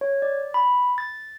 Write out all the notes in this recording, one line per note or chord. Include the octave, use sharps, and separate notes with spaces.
C#5
D5
B5
A6